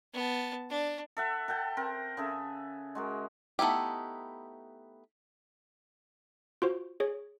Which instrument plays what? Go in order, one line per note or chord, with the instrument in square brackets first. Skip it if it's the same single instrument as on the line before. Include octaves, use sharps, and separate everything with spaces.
[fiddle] B3 A5
D4
[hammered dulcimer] A4 E5 F#5
A4 F#5 G5 A5
C4 A#4
C#3 G#4 A4 E5
G#3 F#4 A#4
[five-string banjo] A3 B3 D#4 E4 G4
[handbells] F4 F#4 C5
G#4 C#5